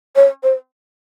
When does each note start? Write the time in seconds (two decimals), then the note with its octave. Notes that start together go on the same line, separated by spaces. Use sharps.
0.16 C#5
0.43 C5